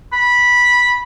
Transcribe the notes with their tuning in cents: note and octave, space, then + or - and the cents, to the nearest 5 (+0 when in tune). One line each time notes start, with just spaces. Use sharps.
B5 -10